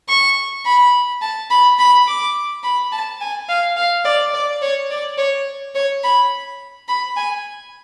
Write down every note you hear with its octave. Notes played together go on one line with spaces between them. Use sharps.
C#6
B5
A5
B5
B5
D6
B5
A5
G#5
F5
F5
D5
D5
C#5
D5
C#5
C#5
B5
B5
G#5